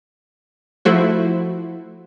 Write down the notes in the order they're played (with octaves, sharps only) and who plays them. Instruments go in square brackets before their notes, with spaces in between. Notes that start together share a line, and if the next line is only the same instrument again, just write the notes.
[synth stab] F3 A3 E4 F#4 C5